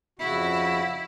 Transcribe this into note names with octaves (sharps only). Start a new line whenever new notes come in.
F2 C#3 E4 F#4